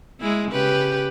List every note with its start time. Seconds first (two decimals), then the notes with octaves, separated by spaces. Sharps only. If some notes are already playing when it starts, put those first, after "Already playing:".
0.20 G#3 E4
0.52 C#3 G4 B4